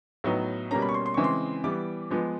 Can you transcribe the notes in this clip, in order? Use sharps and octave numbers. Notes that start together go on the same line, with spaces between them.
A2 F#3 B3 D#4
B2 G3 A#3 C#4 A#5
B5
C#6
C6
C6
C#3 E3 G#3 C4 C#6
C6
E3 G3 B3 D6
F3 G#3 B3